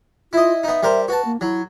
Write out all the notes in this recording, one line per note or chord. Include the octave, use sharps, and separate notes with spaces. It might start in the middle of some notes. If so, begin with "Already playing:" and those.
E4 F4 D#5
B3 D#4 E5
G3 A#4 C5
F#4 B4 A5
A#3
F#3 E4